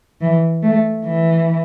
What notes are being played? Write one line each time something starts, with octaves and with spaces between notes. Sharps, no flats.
E3
A3
E3